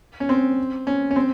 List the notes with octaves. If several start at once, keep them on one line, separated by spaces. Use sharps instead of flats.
C#4
C4
C#4
C#4
C4